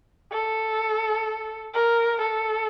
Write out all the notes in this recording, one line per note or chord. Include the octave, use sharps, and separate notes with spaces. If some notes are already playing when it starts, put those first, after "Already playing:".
A4
A#4
A4